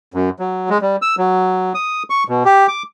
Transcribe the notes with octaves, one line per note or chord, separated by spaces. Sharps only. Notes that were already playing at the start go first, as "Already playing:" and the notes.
F#2
F#3
G#3
G3
E6
F#3
D#6
C#6
B2
G4
D6